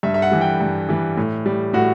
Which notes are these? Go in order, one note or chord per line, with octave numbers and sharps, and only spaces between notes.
G2 E5
E5
F#5
E3 G3
G5
G2
E3 G3
A2
G3
A2 F#4